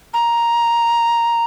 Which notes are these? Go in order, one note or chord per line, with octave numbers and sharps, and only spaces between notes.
A#5